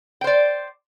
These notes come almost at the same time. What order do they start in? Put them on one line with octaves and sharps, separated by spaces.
G5 C5 D5